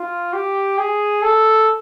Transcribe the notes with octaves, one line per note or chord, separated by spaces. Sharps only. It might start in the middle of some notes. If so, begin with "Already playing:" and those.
Already playing: F4
G4
G#4
A4